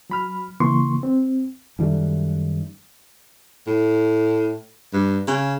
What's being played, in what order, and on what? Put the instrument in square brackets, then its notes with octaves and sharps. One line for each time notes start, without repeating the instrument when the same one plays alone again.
[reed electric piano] F#3 B5 F6
C#3 E3 A#3 C6 C#6
C4
[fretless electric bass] F#2 D#3 G3 A3
[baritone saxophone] A2
G2
C#3